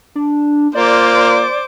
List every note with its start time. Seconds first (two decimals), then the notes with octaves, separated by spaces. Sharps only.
0.15 D4
0.75 A#3 F4 C5 D5 D6